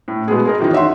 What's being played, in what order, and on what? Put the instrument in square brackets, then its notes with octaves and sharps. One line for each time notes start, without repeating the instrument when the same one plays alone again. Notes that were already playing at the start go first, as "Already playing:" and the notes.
[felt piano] A2
B2 G#3 B3 G#4
G#4 A#4 D#5
F#2 D#3 E3 D#4
C#5 E5 F#5 C6